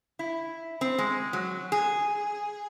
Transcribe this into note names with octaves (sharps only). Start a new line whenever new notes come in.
E4
C4
G#3
F#3
G#4